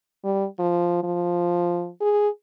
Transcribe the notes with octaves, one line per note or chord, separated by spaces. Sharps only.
G3
F3
F3
G#4